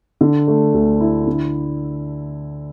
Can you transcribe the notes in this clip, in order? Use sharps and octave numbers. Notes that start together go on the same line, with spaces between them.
D3
A3
D2
E4
D3